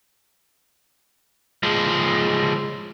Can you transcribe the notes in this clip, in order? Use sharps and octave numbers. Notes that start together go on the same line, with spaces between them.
F3 G#3